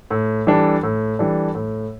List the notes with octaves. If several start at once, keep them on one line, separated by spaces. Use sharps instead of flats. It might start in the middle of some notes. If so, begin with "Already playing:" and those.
A2
E3 G3 D4 A4
A2
E3 G3 D4 A4
A2